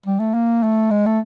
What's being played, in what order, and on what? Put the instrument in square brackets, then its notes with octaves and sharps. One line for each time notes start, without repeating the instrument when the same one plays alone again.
[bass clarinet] G3
A3
A#3
A3
G#3
A3